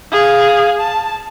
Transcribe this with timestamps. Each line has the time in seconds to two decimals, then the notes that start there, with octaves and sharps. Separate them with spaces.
0.11 G#4 F5
0.78 A5